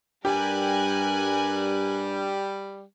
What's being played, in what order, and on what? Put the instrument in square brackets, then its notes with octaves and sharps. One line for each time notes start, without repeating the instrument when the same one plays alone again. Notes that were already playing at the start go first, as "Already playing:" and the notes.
[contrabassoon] G2 [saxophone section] G3 [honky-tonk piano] G4 [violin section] A#4 G#5 F#6